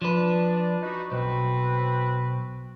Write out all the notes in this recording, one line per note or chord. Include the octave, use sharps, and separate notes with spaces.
F3 D4 B4
D#4 F#4 B4
B1 C4 F#4 B4